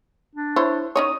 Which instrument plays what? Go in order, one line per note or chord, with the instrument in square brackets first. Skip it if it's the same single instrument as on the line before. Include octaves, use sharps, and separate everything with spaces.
[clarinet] D4
[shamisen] E4 C5 C#5
[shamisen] C#4 D#4 C#5 [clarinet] D#6